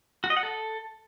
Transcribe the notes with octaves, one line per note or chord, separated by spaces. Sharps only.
F#4
D#5
F#5
A4